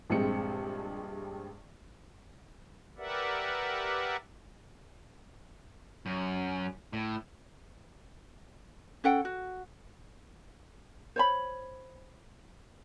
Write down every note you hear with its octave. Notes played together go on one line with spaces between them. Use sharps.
A#1 G2 G#3 C4 C#7
G4 A#4 B4 D5 E5 F#5
F#2
A2
C#4 A4 F#5 G5
F#4
C5 C#5 B5